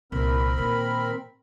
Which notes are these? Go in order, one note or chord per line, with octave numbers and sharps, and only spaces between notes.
C2 A#2 C4 A#4 B5
A#2 D#3